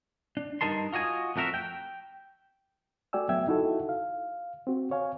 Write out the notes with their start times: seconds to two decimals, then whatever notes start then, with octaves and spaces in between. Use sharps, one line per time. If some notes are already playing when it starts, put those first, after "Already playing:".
0.37 D4
0.61 G2 B3 D#4 A#4 A5 C6
0.93 F4 F#4 D#5 G#5
1.36 F2 A3 F#4 A#4 E5
1.54 G5
3.13 A3 F#4 D5 G5 G#5 E6
3.29 F#3 B3 E5 G5 E6 G#6
3.48 D#4 E4 F#4 A4
3.89 F5
4.67 C4 F#4
4.91 C#5 F5 G#5